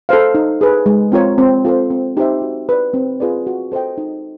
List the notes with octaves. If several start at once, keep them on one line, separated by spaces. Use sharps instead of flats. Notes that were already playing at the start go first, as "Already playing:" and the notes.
A4 C5 F5
D#4
G#4 B4
G#3
C4 F4 A#4 C#5
C4
F4 A4 C5
C4
D#4 G4 C5 E5
F#4
B4 D5
C4
F4 G#4 B4 D5
F#4
A4 C5 D#5 G5
D#4